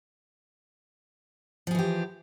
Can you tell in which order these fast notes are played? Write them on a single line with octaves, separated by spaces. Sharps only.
F3 G#4 E3 G4